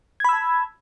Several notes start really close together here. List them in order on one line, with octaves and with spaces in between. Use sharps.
G#6 B5 E6 A5